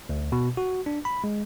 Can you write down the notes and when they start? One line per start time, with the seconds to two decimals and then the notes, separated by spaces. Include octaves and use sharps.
0.09 D2
0.32 B2
0.57 F#4
0.86 D4
1.05 B5
1.24 G#3